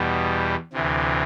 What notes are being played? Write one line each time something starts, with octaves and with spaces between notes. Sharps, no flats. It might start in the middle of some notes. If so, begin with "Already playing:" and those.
Already playing: E2 B2 G3
D2 C3 E3